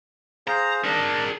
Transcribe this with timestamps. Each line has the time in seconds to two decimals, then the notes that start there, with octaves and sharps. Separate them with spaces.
0.47 G#4 C5 F5 A#5
0.84 D4 G#4 A#4